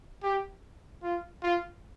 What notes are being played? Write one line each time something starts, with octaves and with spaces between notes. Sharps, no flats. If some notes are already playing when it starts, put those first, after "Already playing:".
G4
F4
F4